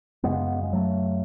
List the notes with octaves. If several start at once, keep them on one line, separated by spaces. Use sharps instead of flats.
F#2 C#3 G#3 B3
G#3
F#3 A3